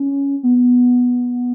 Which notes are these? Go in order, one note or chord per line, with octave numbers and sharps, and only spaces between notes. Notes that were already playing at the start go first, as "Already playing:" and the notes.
Already playing: C#4
B3